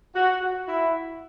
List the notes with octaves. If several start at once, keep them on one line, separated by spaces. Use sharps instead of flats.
F#4
F#4
E4